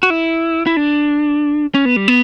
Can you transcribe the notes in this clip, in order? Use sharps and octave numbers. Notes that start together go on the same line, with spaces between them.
F#4
E4
E4
D4
C#4
B3
G3
B3